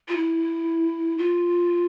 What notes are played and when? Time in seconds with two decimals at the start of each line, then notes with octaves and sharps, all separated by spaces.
0.08 F4
0.17 E4
1.18 F4